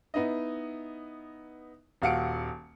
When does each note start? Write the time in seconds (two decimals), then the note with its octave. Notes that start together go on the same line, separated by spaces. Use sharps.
0.14 B3 D#4 E4 D#5
2.02 D#1 F#4 F5 F#5 C#7 D7